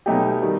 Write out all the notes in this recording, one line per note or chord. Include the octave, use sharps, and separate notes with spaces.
B2 F#3 A3 D#4 G4
D#3 G3